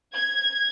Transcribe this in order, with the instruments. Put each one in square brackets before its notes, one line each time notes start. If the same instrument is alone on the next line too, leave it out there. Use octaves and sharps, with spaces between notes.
[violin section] G#6